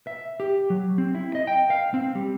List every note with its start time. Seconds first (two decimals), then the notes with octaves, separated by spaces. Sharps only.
0.07 E5
0.40 G4
0.70 F#3
0.98 C4
1.15 E4
1.35 D#5
1.47 G5
1.70 F5
1.94 C4
2.15 G3